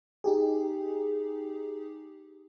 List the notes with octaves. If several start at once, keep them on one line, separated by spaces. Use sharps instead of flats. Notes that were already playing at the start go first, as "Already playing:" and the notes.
D#4 G4 G#4